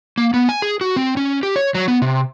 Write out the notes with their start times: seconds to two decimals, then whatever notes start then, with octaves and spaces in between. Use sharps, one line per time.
0.18 A#3
0.34 B3
0.49 G#5
0.62 G#4
0.81 F#4
0.96 C4
1.17 C#4
1.43 G4
1.56 C#5
1.75 F#3
1.88 B3
2.02 C3